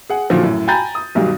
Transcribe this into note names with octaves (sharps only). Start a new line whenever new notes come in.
G#4 F#5
A#2 D3 D#3 F3 F#3 A3
F#2 A2
G5 G#5 A#5 B5 G6 A6
D#6
B1 G2 D#3 F#3 G3